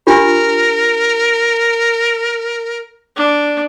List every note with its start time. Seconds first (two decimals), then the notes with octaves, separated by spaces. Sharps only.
0.07 D4 F4 G4 A#4
3.17 D4